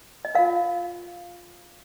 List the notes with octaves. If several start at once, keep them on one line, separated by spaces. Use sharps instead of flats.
D#5
F4 A#4 F5